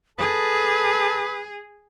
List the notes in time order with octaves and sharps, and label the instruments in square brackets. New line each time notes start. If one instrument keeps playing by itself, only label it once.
[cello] G#4 [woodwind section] A4 A5 [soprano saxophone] B4 [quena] D#6